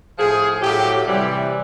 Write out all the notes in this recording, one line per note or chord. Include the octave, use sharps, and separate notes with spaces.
A2 F3 G#4
A2 F#3 G4
C3 E3 G3 G4